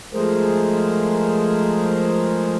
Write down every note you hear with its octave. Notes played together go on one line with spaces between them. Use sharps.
F3 G#3 A3 G#4 A#4 C5